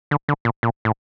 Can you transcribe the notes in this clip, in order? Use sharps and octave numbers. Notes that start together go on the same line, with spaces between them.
D3
D3
A#2
A#2
A2